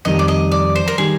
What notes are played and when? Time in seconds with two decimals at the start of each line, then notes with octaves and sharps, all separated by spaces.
0.05 F2 D#3 G3 D#5
0.19 D5
0.28 D#5
0.52 D5
0.75 C5
0.88 A#4
0.98 D#3 G3 G#4